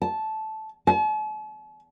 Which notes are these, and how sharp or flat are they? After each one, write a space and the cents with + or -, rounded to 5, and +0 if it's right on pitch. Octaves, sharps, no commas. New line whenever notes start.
A5 -10
A5 -45